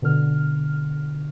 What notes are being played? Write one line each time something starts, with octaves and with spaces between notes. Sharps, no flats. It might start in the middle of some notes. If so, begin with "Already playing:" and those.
B2 D3 F6